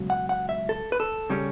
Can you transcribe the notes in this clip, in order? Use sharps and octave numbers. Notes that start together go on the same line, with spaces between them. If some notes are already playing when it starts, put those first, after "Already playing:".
Already playing: C#2 B2 F#3
F#5
F#5
E5
A4
B4
A4
C#3 G3 C#4